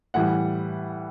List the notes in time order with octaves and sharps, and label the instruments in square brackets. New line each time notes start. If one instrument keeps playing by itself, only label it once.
[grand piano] A2 E3 G3 F#5